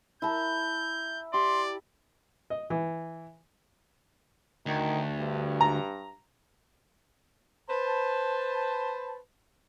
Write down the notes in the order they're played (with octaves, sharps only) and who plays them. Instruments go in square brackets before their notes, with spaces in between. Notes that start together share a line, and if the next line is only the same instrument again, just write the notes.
[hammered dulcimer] E4 A5 A#5 [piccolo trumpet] G6
[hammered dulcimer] G4 [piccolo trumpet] D5 [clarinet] C6
[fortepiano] D#5
E3
[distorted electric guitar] D2 [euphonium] D#3
[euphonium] G2
[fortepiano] A#5
[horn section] B4 C5 A5